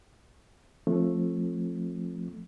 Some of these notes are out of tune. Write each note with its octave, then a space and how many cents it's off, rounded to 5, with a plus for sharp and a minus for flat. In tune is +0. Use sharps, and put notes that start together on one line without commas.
F3 +0 A3 +0 C4 +30